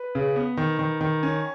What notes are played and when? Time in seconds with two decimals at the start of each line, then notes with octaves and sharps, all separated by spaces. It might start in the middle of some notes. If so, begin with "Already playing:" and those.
Already playing: B4
0.15 C#3
0.36 B3
0.57 D#3
0.79 D#3
1.01 D#3
1.23 C#4